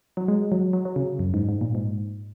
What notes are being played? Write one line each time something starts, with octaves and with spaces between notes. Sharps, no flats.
F#3
G#3
F#3
F#3
F#3
C#3
F#2
G#2
G#2
A#2
G#2